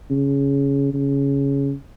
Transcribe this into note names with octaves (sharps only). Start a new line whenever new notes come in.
C#3
C#3